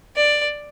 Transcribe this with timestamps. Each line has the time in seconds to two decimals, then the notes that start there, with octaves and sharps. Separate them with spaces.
0.16 D5